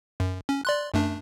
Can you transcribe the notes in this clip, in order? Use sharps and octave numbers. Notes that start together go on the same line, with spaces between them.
F#2
C#4
D5 C6 F#6
F#2 A3 D4